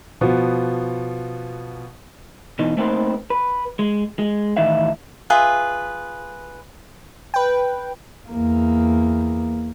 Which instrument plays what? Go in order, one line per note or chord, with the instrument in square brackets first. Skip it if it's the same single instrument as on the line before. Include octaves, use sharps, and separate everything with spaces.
[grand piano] B2 F3 B3
[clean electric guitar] B2 E3 D#4
A3 A#3 C4 D#4 B4 C5
B4
G#3
G#3
A2 D#3 E3 D#4 E5 F5
[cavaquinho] F4 G#4 B4 E5
[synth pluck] B4 G5
[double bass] E2 A#3